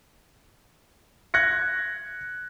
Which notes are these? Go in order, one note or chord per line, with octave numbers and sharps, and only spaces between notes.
F#6 G#6 A#6 C#7